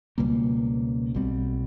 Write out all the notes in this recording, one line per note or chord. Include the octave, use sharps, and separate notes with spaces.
C#2 B2 G3 A#3
B1 B2 G3 C4